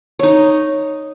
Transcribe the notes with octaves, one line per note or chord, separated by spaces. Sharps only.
D#4 C#5